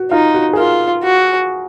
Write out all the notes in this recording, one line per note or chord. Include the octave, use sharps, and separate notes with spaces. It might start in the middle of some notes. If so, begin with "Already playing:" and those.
Already playing: F#4
D#4 F4
F#4
G#4
F4 A#4
F#4